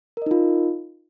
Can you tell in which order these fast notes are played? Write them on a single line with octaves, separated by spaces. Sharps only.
A#4 D#5 D#4 F4